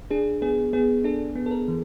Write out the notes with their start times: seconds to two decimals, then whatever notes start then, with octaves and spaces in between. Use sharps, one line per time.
0.11 D4 G#4
0.42 B3 G#4
0.73 B3 G#4
1.04 D4 A4
1.36 B3
1.46 A4
1.51 A#4
1.68 E3